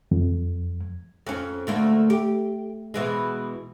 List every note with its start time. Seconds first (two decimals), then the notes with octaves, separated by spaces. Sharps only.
0.11 F2
1.27 F2 C#4
1.67 D2 A3 A#3
2.10 G4
2.94 B2 E3 G#3